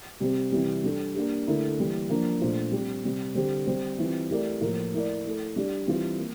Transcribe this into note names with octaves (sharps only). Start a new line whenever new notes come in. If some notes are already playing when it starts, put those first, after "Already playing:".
C3 G3 C4 G4
C3 E3 G3
G3 D4 A4
A#3 D4 G4
D3 A3 E4 A#4
E3 G3 A#3
F3 A#3 D4
A#2 A3 D4 F4 C5
G3 C4 G4
C3 G3 C4
D3 G3 C4 G4 C5
G3 C4 G4 C5
E3 G3 C4 F4
A3 E4 G4 A#4 D5
A2 F3 A#3 F4 A#4
A3 E4 A#4 D5
A3 E4 A4
G3 D4 G4 D5
E3 G3 C4 F4
A#3